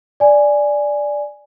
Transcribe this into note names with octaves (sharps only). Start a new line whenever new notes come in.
D5 G#5